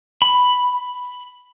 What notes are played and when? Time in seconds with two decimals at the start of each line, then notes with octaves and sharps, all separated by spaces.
0.22 B5